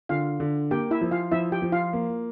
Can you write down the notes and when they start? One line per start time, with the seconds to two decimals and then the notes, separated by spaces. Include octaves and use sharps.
0.09 D3 F4 F5
0.40 D3
0.71 A#3 G4 G5
0.91 E4 E5
1.01 F3
1.11 F4 F5
1.32 F3 E4 E5
1.52 G4 G5
1.62 F3
1.72 F4 F5
1.93 A#3